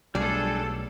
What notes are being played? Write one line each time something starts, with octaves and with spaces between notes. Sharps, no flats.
B1 G3 A3 D4 G#4 A4 D5